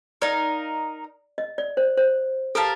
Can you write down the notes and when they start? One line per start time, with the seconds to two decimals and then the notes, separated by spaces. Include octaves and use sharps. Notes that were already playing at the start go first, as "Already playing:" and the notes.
0.22 D#4 A#4 D5 F5
1.38 D#5
1.58 D5
1.77 C5
1.97 C5
2.55 G4 A4 A#4 F5 A5